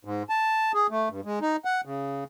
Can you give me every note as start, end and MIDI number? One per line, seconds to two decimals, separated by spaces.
0.05 0.23 44
0.30 0.72 81
0.74 0.87 68
0.91 1.09 57
1.10 1.21 43
1.25 1.39 56
1.42 1.56 63
1.65 1.81 78
1.85 2.24 49